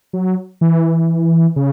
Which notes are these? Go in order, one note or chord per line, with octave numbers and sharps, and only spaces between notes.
F#3
E3
C#3